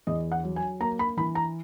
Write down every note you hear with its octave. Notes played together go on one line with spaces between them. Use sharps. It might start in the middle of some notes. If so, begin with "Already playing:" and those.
E2 D#5
F#5
F#3
G#5
A#3 A#5
B5
E3 B5
A#5